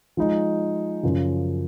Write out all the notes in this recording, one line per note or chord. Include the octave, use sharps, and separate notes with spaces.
F3 G#3 D#4
F#2 C#3 F3